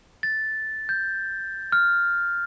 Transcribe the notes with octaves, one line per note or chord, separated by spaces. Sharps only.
A6
G6
F6